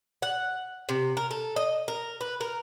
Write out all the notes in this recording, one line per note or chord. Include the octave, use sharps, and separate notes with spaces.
F#5
C3
A#4
A4
D#5
A#4
B4
A#4